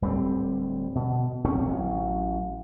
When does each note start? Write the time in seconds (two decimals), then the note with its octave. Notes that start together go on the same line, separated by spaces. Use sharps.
0.02 D1 G3 A3 C4
0.95 B2
1.44 D1 B1 C4 C#4
1.67 A1 F#3